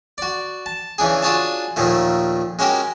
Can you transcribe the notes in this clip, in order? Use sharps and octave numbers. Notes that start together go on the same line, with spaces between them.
F#4 D5
A5
C#3 E3 D4 G#4
D4 F4 F#4 G#4 C#5 A5
D#2 A#2 D#3 F3 A3
G#3 C#4 F#4 G4 A#4